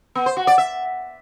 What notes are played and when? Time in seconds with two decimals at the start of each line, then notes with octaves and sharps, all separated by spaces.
0.15 B3
0.26 C5
0.37 F#4
0.47 D5
0.58 E5